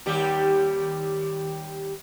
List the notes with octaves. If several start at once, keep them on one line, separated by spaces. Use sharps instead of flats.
D#2 G3 G4